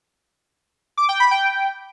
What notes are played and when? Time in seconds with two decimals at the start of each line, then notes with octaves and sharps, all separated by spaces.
0.97 D6
1.09 G5
1.20 B5
1.31 G5